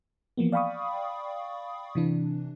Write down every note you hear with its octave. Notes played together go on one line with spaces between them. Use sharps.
E3 F3 A#3 B3
D5 F5 G5 B5 C#6 D#6
C3 E3 D4